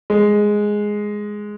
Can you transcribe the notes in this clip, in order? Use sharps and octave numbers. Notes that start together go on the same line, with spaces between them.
G#3